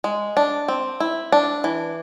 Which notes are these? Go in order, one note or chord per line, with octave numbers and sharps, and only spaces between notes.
G#3
D4
C4
E4
D4
E3